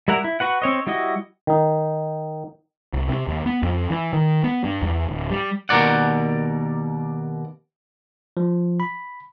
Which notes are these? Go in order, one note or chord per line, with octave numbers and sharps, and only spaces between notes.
G3 E4 A#4 F#5 A#5
E4
F#4 B4 F#5
C4 C#5 D#5
G3 E4 F#4 D#5
D#3 D#4
C2
C3
D#2
B3
F2
E3
D#3
B3
G2
E2
D1
G3
D#2 B2 A#4 D5 F#5
F3
B5